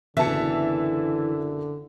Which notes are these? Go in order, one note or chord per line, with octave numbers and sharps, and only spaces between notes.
F#1 B2 D3 E3 E5 A5 C#7